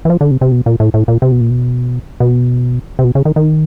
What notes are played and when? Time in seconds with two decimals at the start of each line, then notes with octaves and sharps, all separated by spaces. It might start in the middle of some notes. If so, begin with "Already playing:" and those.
0.05 E3
0.10 F3
0.21 D3
0.31 C3
0.41 C3
0.52 B2
0.66 A#2
0.80 A2
0.94 A2
1.08 A#2
1.22 C3
1.32 B2
1.41 A#2
1.50 B2
2.20 B2
2.99 C3
3.04 B2
3.15 C#3
3.25 D#3
3.36 D#3